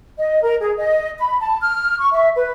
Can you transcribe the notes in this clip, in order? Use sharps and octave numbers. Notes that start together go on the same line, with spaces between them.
D#5
A#4
G#4
D#5
B5
A5
F6
C#6
E5
B4